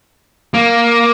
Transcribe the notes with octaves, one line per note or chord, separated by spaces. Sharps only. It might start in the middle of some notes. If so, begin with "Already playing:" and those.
A#3